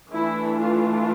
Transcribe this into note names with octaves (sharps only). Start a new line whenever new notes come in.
E3 A3 D4 E4
F4